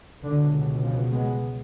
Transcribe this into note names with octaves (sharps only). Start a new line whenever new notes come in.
C#2 B2 D3
C#3 F3
G#3 B3